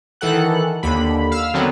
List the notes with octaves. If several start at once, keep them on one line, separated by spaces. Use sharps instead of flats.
D#3 E3 A4 F#5 F#6
D#2 D3 B5
F5 E6 F6
D3 D#3 F#3 B3 C4